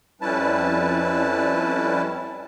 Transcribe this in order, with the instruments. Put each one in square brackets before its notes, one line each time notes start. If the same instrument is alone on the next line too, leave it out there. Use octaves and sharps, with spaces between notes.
[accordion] F2 G3 C#4 E4 B4 A5